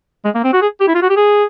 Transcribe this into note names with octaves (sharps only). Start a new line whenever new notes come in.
G#3
A#3
C4
F#4
G#4
G4
E4
F4
F#4
G4
G#4